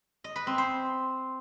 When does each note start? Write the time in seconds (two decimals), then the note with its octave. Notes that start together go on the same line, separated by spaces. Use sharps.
0.24 D#5
0.36 B4
0.47 C4
0.58 C5